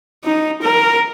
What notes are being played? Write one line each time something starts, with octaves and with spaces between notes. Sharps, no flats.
D#4
A#4